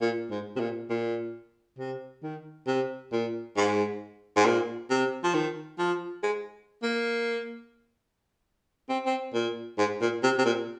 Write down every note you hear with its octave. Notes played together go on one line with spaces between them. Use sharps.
A#2
G#2
C3
A#2
A#2
C3
D#3
C3
A#2
G#2
G#2
A#2
C3
F3
D#3
F3
G#3
A#3
C4
C4
A#2
G#2
A#2
C3
C3
A#2